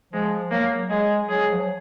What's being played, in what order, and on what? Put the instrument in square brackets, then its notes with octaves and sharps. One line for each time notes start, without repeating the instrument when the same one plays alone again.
[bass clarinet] F3 [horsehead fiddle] G#3
[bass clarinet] F#3 [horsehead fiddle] A#3
[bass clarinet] G#3 [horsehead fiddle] G#4
[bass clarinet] F#3 [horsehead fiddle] G#4
[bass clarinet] F3
F#3